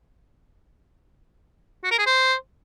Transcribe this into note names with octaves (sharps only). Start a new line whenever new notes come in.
F#4
A#4
G#4
C5